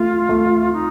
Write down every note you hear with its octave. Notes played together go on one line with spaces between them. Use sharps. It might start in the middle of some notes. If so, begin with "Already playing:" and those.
Already playing: A3 F4
A3
D#4